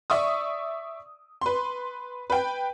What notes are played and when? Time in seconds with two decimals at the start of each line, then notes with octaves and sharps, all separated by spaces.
0.10 D5 E5 C#6 D#6
1.41 B4 C6
2.30 B4 G5